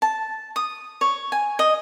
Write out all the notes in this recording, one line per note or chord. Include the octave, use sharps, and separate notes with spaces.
A5
D#6
C#5
G#5
D#5